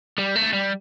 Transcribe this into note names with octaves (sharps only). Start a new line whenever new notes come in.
G3
A3
G3